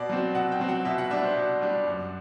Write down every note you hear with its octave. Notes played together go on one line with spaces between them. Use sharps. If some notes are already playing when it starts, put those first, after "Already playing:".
Already playing: B2 D5
F#3 C4
B2 F#5
G5
F#3 C4
F#5
B2 E5
F#5
G3 D4 E5
C5
B2
G3 D4
F#2